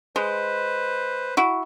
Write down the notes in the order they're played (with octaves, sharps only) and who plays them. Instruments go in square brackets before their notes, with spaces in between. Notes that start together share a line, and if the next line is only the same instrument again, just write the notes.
[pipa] G#3 [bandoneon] B4 C5
[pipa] E4 F#4